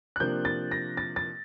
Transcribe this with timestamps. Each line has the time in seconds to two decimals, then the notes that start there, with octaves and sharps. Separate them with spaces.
0.16 F#6
0.20 C3 F3 A#3 D4 G6
0.45 A6
0.72 A#6
0.97 A6
1.16 A6